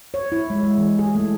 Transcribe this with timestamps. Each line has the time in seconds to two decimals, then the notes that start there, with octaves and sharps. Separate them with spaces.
0.14 C#5
0.32 E4
0.50 G#3
0.63 G#3
0.78 E3
0.99 G#4
1.15 A3